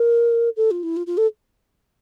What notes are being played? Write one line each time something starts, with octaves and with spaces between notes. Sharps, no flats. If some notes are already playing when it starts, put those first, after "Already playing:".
Already playing: A#4
A4
F4
E4
F4
F4
A4